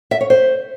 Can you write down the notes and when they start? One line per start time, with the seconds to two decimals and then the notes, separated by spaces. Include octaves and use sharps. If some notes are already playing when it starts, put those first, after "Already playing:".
0.11 E5
0.21 C#5
0.30 C5